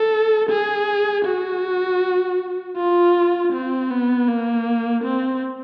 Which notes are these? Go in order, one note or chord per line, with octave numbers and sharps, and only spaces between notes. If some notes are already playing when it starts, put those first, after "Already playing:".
Already playing: A4
G#4
F#4
F4
C4
B3
A#3
C4